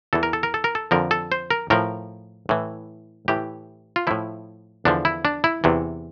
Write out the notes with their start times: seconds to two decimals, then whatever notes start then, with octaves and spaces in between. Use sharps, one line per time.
0.13 E2 E3 A4
0.23 A#4
0.33 A4
0.43 A#4
0.54 A4
0.64 A#4
0.75 A4
0.91 F2 D3 F3 A#4
1.11 A4
1.32 C5
1.50 A#4
1.70 A2 F3 A#4
2.49 A2 E3
3.28 A2 E3 G4
3.96 F4
4.07 A2 F3 E4
4.85 E2 D3 F3 D4
5.05 E4
5.25 D4
5.44 E4
5.64 E2 C3 E3